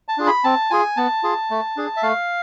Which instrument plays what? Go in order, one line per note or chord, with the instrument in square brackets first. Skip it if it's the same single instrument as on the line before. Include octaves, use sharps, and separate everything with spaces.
[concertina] A5
D4 F4 G#4
B5
C4 A5
F4 G#4 G#5
B3 A5
F4 G#4
A3
D4 G#4
E5
A3 F5